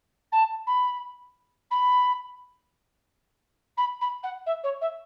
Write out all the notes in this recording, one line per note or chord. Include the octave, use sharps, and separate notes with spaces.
A5
B5
B5
B5
B5
F#5
E5
C#5
E5